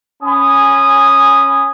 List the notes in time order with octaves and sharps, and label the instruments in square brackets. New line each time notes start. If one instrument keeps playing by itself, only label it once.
[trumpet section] C#4 G#5 B5 D#6